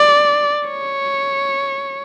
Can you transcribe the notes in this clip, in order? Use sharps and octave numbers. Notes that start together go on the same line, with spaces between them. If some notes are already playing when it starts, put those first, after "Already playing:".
Already playing: D5
C#5